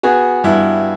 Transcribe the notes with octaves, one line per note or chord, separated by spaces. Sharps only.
B3 F#4 G#4
G2 E4